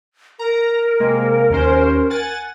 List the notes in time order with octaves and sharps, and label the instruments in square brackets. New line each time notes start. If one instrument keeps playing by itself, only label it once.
[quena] A#4 [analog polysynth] A#5
[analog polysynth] C3 G#3 A#3
D#2 C#4 C5
F#5 G#5 A6